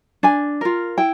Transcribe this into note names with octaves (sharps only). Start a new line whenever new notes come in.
D4 G#5
F4 A#4
E4 G5